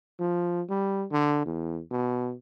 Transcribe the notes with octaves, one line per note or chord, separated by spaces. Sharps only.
F3
G3
D3
E2
B2